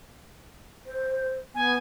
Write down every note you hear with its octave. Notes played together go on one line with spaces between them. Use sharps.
C5
B3 G#5